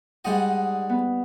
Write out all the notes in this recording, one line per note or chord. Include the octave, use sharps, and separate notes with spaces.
G#2 G3 G#3 D#4 D#5 F#5
B3